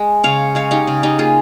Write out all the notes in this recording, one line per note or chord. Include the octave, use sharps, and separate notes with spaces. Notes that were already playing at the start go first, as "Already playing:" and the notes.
Already playing: G#3
C#3 C#5 F5
G#3 C#5 F5
D#4 G4
C#3
D#4 G4
A#3 F4 G#4